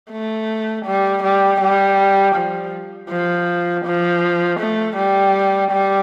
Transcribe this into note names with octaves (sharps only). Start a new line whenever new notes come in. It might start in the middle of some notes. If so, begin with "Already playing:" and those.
A3
G3
G3
G3
F3
F3
F3
A3
G3
G3